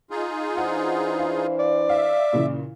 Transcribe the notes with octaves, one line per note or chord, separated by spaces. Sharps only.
D#4 F4 G#4
E3 D4 C5 F#5
F5
D5
E5 F5
A#2 C#3 E3